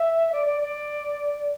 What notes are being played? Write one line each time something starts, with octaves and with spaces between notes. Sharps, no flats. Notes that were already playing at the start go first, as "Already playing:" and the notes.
Already playing: E5
D5
D5
D5